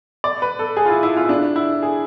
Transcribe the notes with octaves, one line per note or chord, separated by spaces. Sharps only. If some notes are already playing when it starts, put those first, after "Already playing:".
D5
B4
A4
G#4
F4
E4
E4
F4
E4
D4
E4
G#4